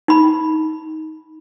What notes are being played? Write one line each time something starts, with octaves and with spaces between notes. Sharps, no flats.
D#4 B5